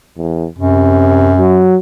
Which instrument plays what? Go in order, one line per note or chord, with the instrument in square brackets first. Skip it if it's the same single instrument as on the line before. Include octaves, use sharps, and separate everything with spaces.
[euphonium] E2
[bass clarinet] F#2 [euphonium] C3
[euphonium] F#3